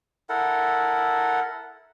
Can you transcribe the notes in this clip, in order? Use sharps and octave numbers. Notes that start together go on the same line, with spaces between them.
E4 A4 A#4 F#5